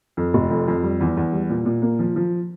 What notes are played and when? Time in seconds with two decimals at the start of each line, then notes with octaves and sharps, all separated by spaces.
0.17 F2
0.34 F1
0.50 F2
0.68 F2
0.83 G3
1.01 E2
1.17 E2
1.32 G3
1.49 A#2
1.65 A#2
1.82 A#3
1.99 F3
2.16 F3